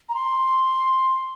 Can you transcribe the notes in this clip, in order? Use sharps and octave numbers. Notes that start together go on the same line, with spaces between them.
A#5
C6